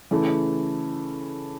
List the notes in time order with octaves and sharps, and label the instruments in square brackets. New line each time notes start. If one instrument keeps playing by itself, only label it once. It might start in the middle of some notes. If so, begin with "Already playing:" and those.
[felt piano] C#3 E3 A3